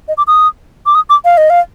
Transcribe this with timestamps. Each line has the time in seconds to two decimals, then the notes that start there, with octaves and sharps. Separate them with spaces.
0.08 D#5
0.18 D6
0.27 D#6
0.86 D6
0.95 D#6
1.10 D6
1.25 F5
1.38 D#5
1.50 F5